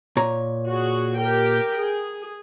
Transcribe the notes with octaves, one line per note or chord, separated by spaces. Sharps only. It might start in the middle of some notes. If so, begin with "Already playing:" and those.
A#2 C#5 A#5
F#4 G#4
G4 A#4 G5
G#4